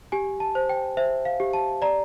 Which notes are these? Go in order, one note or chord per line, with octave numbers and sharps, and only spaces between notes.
G4 G#5
A5
C5
G5
C5 E5
F5
G4
A5
D5 A#5